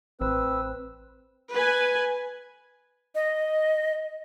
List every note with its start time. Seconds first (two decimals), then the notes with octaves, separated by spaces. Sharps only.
0.21 A1 C4 B4 E6
1.52 B4 G#5
3.15 D#5